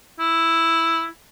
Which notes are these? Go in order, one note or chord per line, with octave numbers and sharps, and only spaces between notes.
E4